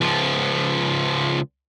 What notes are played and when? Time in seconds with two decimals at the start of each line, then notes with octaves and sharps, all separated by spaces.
0.01 C#2 F3